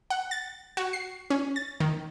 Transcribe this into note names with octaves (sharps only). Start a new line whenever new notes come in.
F#5
A6
F#4
C7
C#4
A6
D#3